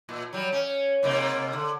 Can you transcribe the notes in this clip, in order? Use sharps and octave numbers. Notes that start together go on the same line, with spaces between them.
A#2
F#3 G3
C#4
G#2 C3 A#3
D3